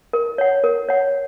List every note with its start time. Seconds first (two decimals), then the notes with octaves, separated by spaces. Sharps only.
0.13 A#4
0.38 C#5 F#5
0.64 A#4
0.88 C#5 F#5